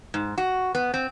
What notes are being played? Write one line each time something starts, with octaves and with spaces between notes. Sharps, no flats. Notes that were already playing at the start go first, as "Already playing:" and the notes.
G#2
F#4
B3
C4